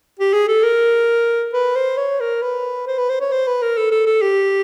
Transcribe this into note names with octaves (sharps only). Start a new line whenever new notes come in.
G4
G#4
A4
A#4
B4
C5
C#5
A#4
B4
C5
B4
C5
C#5
C5
B4
A#4
A4
A4
A4
G4